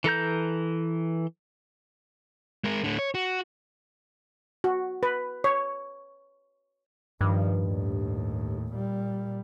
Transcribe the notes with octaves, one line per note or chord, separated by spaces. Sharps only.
E3 A4 A#5 G6
G#3 A#4
A2 D3
C#5
F#4
F#4
B4
C#5
G2 D#3 F3
D#2 A2
A#2 G3